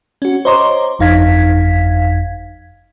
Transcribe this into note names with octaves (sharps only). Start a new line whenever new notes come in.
C#4 F#4
C5 C#5 D#5 A#5 C6 D6
G1 F2 D#4 F5 G#6 B6